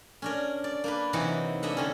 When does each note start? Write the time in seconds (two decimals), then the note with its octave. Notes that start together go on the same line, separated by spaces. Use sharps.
0.22 C#4 D4 A#4
0.64 D5
0.84 A#3 D4 B4
1.13 C3 E3 F#3 D#4 E4 F#4
1.63 A#3 D4 D#5 E5 F#5
1.77 D3 C4 C#4